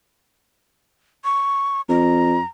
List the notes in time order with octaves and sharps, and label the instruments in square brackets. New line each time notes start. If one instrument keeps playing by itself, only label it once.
[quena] C#6
[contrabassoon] F2 [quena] A#5